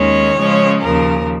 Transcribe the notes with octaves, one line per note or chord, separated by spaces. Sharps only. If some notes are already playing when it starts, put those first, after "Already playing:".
Already playing: D#2 D#3 G#3 C#4 C#5
C#3 F3 G#3 C#4
D#2 C#3 F3 A#4